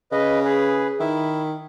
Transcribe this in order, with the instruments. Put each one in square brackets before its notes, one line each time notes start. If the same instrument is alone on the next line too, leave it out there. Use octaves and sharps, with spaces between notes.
[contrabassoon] C#3 [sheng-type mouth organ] B4 D#5
[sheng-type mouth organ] G#4 B4
[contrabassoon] D#3 [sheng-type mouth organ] E4 E5